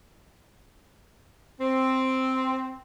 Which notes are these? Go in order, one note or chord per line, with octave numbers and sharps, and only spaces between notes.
C4